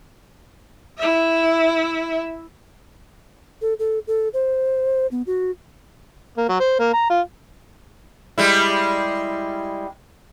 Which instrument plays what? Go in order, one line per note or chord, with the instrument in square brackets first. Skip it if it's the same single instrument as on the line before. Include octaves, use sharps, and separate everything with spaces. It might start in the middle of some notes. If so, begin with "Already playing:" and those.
[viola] E4 E5
[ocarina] A4
A4
A4
C5
B3
F#4
[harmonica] A#3
F#3
C5
A#3
A#5
F4
[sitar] G3 G#3 E4